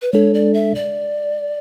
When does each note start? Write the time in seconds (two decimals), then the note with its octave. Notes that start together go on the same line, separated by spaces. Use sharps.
0.02 B4
0.12 G#3 D4 A4 C#5
0.34 D5
0.54 E5
0.75 D5